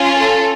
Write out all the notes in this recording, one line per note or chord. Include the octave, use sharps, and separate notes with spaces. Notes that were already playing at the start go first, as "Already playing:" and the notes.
Already playing: C#4 F4
A4